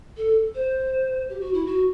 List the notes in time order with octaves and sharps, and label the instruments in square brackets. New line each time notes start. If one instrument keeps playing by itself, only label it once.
[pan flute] A4
C5
G4
F#4
E4
F#4